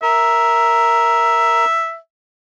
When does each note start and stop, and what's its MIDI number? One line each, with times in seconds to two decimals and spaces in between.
0.02 1.65 70
0.02 1.97 76